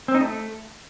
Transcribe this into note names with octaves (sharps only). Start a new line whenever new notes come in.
C4
D#4
A3